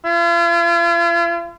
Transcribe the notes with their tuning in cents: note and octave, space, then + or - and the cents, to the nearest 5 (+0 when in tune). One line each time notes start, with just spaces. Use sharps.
F4 -45